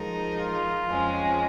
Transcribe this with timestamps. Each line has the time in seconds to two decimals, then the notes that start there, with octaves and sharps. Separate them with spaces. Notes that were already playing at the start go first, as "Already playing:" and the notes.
Already playing: F3 G#3 D#4 A#4
0.39 F4
0.90 F2 F3 G#3 C#4